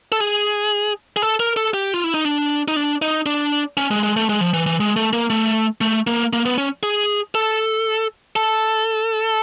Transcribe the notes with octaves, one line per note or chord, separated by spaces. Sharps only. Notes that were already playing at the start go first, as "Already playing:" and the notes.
A4
G#4
G#4
A4
A#4
A4
G4
F4
E4
D#4
D4
D#4
D4
D#4
D4
C#4
G#3
G#3
A3
G#3
F3
E3
E3
G#3
A3
A#3
A3
A3
A#3
A#3
B3
C#4
G#4
A4
A4